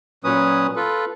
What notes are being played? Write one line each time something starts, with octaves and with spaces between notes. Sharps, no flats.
A#2 F#3 C#4 B4 D#6
F4 A4 B4